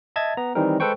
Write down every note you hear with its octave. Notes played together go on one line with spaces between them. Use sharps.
D#5 E5 A5 G#6 A6
B3 A#5
D#3 E3 G3 C4 D#4 A#4
G#3 A4 B4 C5 G5 C#6